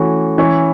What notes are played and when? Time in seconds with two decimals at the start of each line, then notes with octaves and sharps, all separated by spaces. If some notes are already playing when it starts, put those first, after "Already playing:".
Already playing: E3 A3 C#4 F#4
0.38 E3 C#4 E4 C#5